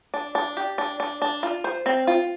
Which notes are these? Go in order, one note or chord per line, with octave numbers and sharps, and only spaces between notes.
D4
D4
G4
D4
D4
D4
F4
C5
C4
F4